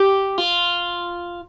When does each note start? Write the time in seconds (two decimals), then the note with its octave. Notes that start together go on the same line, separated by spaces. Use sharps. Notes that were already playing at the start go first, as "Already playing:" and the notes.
Already playing: G4
0.38 F4